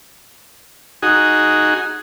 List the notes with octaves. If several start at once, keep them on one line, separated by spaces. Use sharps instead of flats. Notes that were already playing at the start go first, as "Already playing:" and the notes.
D#4 F#4 G#4